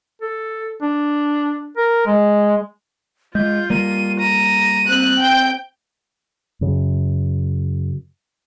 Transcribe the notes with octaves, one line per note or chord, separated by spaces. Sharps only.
A4
D4
A#4
G#3
G#3 F4 G6
G3 A#3 D#7
A#5 D#7
C4 F#6
G5 G6
F#2 C#3